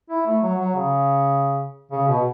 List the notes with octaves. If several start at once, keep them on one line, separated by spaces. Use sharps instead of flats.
E4
A3
F#3
F#3
C#3
C#3
B2